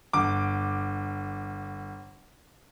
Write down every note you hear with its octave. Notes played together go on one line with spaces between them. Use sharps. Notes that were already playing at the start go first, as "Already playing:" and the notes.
G1 D6